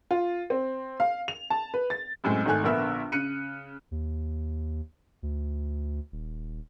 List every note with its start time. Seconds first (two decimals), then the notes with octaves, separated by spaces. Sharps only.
0.11 F4
0.50 C4
1.00 F5
1.28 F7
1.50 A5
1.74 B4
1.90 A6
2.24 F#2 A2 G#3 C4
2.46 G#1 D#3 A3 G#5 F#6
2.64 A#1 D3 B3 A#4 E5 E6
3.12 C#3 F#6 C#7 D#7
3.91 D#2
5.23 D2
6.12 D#1